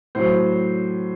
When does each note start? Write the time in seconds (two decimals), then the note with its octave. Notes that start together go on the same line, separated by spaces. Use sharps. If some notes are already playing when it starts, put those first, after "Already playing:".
0.15 A2 F#3 C5